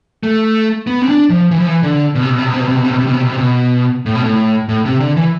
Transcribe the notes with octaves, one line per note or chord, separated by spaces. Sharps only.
A3
B3
C4
D4
F3
E3
F3
E3
D3
B2
C3
B2
C3
B2
C3
B2
C3
B2
C3
B2
C3
B2
C3
B2
C3
B2
A2
B2
A2
A2
C3
D3
E3